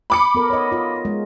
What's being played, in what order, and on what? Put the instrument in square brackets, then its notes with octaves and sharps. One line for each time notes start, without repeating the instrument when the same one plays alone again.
[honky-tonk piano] B5 D6 C#7
[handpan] B3 A4 A#4
C#5 D#5
F4 D#5
G#3